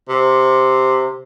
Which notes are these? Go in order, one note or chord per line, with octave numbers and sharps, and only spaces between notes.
C3